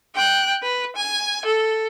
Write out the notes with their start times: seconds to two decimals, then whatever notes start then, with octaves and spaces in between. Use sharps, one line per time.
0.15 G5 F#6
0.63 B4
0.96 G#5
1.45 A4